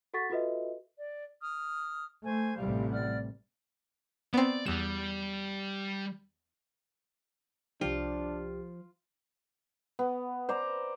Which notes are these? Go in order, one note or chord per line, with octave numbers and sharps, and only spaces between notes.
F#4 A4 F#5 C#6 A6 B6
F4 F#4 A4 B4 D#5 E5
D5
D#6 F6
A3 C5 G#5
A1 C3 G3 F5
D5 F#5 F6
B3 C4 D5
E2 G3 E7
C2 F3 D4 F4 G4
B3
C5 D5 A#5